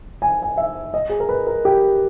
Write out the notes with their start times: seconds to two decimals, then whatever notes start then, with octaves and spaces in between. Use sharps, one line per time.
0.22 G#5
0.42 G#5
0.57 E5
0.94 D#5
1.09 G#4
1.20 A#4
1.29 B4
1.47 A#4
1.65 G4